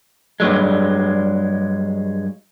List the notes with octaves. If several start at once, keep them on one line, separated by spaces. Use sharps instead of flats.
G2 F#3 G#3